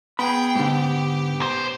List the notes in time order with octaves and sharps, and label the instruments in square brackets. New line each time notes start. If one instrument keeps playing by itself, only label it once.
[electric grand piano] B3 [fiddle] G#4 G5 [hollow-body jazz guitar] B5
[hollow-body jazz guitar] G#2 D3 [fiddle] G4
[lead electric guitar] B1 C5